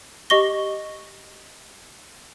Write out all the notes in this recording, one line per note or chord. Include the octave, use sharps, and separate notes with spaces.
G4 D#5 C#6 A#6 G7